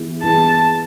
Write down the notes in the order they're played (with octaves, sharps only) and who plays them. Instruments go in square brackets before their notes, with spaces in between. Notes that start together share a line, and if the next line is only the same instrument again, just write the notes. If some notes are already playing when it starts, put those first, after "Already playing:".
Already playing: [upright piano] E3 B3 E4 G#4
[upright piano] E3 B3 E4 G#4 [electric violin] A5